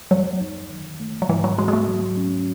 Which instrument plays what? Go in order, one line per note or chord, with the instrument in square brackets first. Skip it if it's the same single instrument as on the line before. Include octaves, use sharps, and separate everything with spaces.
[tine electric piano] F#2 [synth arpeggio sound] F#3
[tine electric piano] D#4
D#3
A3
[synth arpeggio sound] F#3
[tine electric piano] G#2 [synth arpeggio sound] E3
[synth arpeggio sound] F#3
[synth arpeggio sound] G#3 [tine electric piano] F#4
[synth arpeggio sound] G#3
A3
[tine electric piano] F#3
C#4